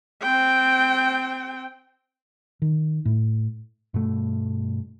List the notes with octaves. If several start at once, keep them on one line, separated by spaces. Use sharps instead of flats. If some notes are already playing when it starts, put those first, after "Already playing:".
C4 G5
D#3
A2
G2 B2 A3